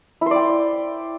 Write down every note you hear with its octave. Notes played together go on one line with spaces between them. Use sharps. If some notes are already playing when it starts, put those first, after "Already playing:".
E4 C5 D5 G5